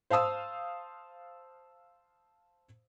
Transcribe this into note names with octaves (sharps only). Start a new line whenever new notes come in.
C5 F5 A5 D#6 E6